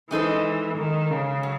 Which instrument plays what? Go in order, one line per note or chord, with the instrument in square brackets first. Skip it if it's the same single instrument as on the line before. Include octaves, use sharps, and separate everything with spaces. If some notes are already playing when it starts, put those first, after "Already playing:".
[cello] E3 [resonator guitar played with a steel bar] G#3 D#4 A4 C5
[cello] D#3
C#3
[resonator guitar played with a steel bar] F#3